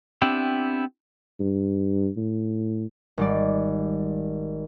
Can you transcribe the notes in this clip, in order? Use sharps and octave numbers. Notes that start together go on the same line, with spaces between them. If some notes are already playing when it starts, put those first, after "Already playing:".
B3 C4 D4 E4 G4
G2
A2
G#1 G3 D5